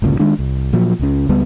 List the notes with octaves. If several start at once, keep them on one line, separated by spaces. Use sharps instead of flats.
G1 C#2 A#2 C#3
D#3 G#3 D4
C2
A#2 F3 F#3
C#2 C#3
C#2 G3 B3